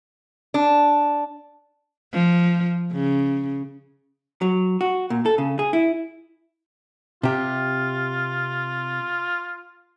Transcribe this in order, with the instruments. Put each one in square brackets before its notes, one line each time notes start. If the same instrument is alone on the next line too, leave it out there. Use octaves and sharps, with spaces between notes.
[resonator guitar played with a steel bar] D4
[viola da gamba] F3
C#3
[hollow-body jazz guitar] F#3
F#4
A#2
A4
C#3
G#4
E4
[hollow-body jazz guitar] C3 G4 [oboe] F4